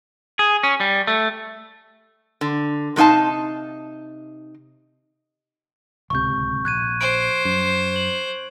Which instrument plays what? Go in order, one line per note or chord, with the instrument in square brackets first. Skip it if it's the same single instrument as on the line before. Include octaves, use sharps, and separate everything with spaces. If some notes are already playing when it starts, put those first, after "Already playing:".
[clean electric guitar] G#4
C#4
G3
A3
[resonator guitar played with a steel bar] D3
C3 A3 D#4 F5 A5
[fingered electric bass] D1 C#2 C3 [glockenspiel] C#6 G6
[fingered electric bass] A#1 [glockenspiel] F#6 G#6 D#7
[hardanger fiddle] C5 [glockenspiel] D7
[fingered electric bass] F#2
[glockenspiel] F#7